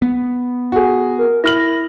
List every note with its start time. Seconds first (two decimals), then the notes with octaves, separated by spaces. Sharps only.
0.02 B3
0.72 F#4 G#4
1.18 A#4
1.44 E4 F6 A#6 F#7